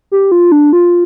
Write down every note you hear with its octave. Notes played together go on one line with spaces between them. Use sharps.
G4
F4
D4
F4